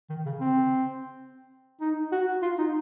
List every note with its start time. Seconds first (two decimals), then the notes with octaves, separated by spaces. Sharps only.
0.09 D#3
0.26 C#3
0.40 C4
1.81 D#4
2.12 F#4
2.42 F4
2.58 D#4